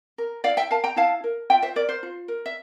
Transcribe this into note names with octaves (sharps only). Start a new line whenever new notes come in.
A#4
E4 D5 F5
E5 G5
A#4 F5 A5
G5 A#5
E4 F5 A5
A#4
F4 E5 G5
C5 E5
A#4 D5
C5
F4
A#4
E5